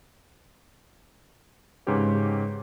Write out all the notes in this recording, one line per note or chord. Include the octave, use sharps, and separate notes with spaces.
G#2 C#3 C#4 G4 B4